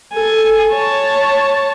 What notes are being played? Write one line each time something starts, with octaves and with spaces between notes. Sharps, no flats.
A4 G#5
C#5 A5